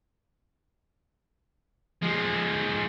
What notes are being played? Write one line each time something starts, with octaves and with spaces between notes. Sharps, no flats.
F3 G#3